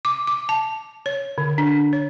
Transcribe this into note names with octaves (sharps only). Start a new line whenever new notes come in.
D6
D6
A5
C#5
D3
D4
C#5